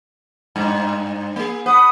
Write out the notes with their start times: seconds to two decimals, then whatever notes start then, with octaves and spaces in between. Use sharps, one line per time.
0.56 G2
1.36 A#3 G#4
1.66 B4 F#5 D#6